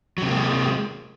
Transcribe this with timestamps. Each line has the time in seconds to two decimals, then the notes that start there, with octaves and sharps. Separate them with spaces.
0.18 F#3
0.22 C3
0.27 A#3
0.32 G#3